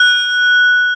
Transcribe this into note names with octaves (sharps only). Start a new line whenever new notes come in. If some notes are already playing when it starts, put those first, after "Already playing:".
Already playing: F#6